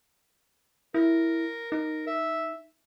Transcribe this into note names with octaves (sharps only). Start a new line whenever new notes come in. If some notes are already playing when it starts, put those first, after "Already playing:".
E4 A#4
D#4 A#4
E5